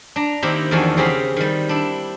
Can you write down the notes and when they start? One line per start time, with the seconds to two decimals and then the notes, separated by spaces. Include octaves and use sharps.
0.16 D4 A#5
0.42 D#3 A#3 C4 E4 G4
0.71 E2 D#3 F3 D4 F#4 G#5
0.97 C#3 C4 G4 G#4 F5 B5
1.36 D#3 G3
1.69 D4 E4